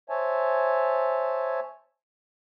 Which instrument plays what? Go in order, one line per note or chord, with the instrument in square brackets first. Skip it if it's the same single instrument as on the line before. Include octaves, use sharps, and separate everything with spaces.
[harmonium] C5 C#5 E5 G#5 A5